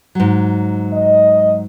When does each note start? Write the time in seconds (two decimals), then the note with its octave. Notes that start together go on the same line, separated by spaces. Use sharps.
0.15 G#2 F#3
0.93 D#5